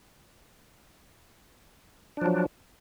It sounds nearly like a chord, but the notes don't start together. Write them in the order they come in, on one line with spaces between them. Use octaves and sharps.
D4 F3 F#3